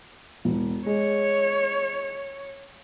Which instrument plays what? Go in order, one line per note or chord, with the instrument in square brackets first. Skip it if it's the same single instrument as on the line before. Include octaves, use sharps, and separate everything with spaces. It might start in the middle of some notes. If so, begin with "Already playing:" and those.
[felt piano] E1
[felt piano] G#3 [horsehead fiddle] C#5